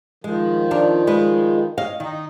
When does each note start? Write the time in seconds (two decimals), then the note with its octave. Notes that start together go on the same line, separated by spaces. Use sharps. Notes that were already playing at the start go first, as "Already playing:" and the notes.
0.24 D#3 F3 G#3
0.71 F2 D4 A#4
1.07 G#3 B4
1.78 C#5 D#5 F5
2.00 D#3 D#4